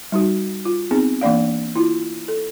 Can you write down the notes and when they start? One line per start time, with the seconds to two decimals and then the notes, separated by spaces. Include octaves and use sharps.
0.12 G3 D#4 F#4
0.65 F4
0.91 B3 C4 D#4 G#4
1.21 E3 A#3 D4 D5 F5
1.76 E4 F4
2.28 A4